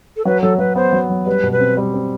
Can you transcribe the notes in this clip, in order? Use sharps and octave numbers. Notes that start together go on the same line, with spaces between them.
A4
F#3 B4
F#3 A4
F#3 B4
B3 C5
F#3
F#3
G3 B4
B2
B4
C4
G3
C4